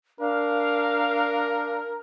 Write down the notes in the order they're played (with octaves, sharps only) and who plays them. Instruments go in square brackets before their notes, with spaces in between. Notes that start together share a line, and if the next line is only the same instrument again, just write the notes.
[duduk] D4 [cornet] A#4 [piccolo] F5